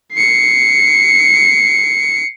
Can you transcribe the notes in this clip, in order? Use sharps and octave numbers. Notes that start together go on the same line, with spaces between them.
C7 C#7